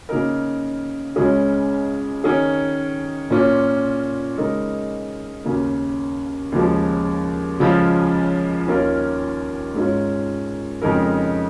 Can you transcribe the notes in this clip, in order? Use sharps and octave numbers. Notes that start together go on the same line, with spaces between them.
C#3 A#3 D#4 A#4
C#2 C#3 G#3 C#4 G#4
D#3 C#4 G#4
A#2 A#3 C#4 F4
C#3 G#3 D#4 A#4
D#2 C#3 A#3
D#2 C#3 F3 G#3
C#2 C#3 F3 G#3 F4
D#2 D#3 C#4 F4 A#4
G#2 G#3 C#4 F4
F2 C#3 G#3 D#4 A#4